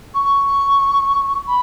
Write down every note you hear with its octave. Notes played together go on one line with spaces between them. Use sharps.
C#6
B5